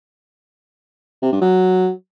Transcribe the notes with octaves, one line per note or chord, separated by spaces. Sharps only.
C3
G2
F#3